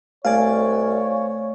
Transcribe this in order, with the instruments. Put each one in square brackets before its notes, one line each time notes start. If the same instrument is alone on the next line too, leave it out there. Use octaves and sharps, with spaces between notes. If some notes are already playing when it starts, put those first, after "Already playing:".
[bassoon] C2 [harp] A3 D5 [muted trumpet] C#5 [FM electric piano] F5 G#5